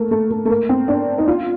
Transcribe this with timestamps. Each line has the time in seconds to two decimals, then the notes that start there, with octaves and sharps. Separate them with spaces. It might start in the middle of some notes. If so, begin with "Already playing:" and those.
Already playing: A3 A#3
0.11 A3
0.31 A3
0.45 A3
0.50 A#3
0.69 C4
0.88 D4
1.18 D#4
1.28 F4